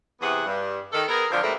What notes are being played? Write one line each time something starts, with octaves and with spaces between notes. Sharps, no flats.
E2 C3 B3 G#4 F#5
G2
D#3 A4
B3 G#4 A#4
D3 F3 F#3 C4 D4
G#2 C3 A3 A#3 B4